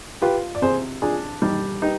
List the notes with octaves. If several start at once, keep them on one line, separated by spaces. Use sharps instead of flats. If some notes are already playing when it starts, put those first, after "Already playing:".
F4 G4 B4
D5
C3 G#4 C5
D4 F4 G#4
G3 D#4 G4
D#4 G4 B4